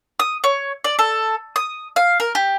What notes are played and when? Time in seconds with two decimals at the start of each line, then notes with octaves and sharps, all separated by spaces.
0.19 D#6
0.44 C#5
0.84 D5
0.99 A4
1.56 D#6
1.96 F5
2.20 A#4
2.35 G4